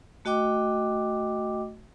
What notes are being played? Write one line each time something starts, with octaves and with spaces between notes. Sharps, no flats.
A3 F#4 D#5 G5 D6